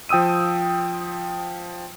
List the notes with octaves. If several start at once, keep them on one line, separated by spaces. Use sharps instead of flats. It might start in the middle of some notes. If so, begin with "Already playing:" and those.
F3 G5 D#6 E6 D#7